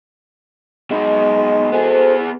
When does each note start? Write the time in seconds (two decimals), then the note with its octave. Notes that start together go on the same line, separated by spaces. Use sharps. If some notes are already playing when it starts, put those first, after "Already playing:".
0.91 B2 G#3 D#4
1.72 B3 F#4 G#4 A4 C5